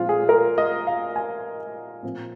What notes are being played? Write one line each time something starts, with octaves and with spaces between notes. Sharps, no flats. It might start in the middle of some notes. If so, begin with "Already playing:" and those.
Already playing: A#2 F3 G#3 C4 F4
G#4
A#4
D#5
F5
G#5
A#2 F3 C4